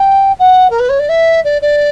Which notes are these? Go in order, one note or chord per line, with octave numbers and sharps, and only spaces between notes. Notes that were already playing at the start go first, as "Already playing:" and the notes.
Already playing: G5
F#5
A#4
B4
C#5
D5
E5
D5
D5